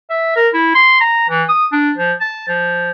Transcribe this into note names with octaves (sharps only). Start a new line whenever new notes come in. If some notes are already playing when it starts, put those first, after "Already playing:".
E5
A#4
E4
C6
A#5
E3
D#6
D4
F3
A5
F3